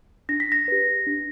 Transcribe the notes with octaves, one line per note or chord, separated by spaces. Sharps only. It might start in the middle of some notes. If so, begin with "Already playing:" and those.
D4 A#6
B6
A#6
G4 B4
D4